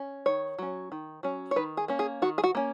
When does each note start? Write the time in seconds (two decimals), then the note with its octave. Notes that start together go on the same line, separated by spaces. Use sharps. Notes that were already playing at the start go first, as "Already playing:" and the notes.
Already playing: C#4
0.26 D#3 C#5
0.58 F#3 C#4
0.92 D#3
1.23 F#3 C#4
1.51 C#5
1.56 D#3 B4
1.77 G#4
1.88 A#3 C#4
1.99 G#4
2.22 D#3 F#4
2.38 G#4
2.44 F#4
2.55 A#3 C#4